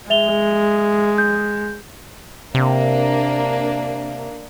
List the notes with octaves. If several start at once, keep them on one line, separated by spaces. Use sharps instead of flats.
G#3 E5 F7 G7
G6
C3 A#3 D4